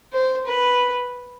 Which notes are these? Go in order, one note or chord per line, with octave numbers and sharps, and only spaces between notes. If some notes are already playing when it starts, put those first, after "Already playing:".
C5
B4